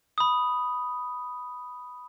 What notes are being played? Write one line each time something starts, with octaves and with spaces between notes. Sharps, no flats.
B5 D#6